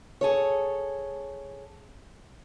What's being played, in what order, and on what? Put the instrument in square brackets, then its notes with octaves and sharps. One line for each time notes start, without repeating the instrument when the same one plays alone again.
[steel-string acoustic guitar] G#4 A4 C#5